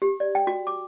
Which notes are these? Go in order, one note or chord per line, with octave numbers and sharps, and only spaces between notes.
G4
D5
G5
F#4
D6